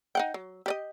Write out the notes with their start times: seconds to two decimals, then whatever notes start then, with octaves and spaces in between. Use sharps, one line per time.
0.15 D#4 F#5 G5
0.34 F#3
0.66 G4 D5 D#5